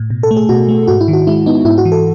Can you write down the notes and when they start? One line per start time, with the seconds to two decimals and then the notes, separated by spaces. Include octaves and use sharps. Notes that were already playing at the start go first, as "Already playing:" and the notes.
Already playing: A2
0.10 B2
0.23 A4
0.31 A3
0.37 G#4
0.49 B2 F#4
0.69 A3
0.88 G#2 F#4
1.01 E4
1.08 D#3
1.13 F#4
1.27 G#3 E4
1.46 B3 D#4
1.65 G#2 E4
1.78 F#4
1.85 E3
1.92 A4